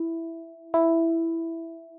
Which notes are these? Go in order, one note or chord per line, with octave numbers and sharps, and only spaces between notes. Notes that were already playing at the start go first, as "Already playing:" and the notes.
Already playing: E4
E4